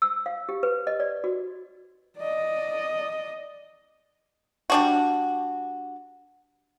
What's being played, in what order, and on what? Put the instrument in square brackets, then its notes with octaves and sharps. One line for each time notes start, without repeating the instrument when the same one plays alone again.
[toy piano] E6
F5
G4
B4
D#5
D5
F#4
[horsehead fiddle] D5 D#5
[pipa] G3 D4 F#4